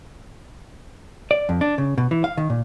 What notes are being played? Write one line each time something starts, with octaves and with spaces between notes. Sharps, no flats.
D5
F2
D4
C#3
B2
E3
F5
D#3
A#2